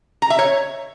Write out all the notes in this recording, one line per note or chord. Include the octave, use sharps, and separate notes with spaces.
A#5
E5
C#5